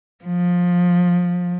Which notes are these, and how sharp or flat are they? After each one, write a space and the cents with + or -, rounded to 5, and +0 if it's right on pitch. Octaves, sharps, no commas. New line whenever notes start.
F3 +20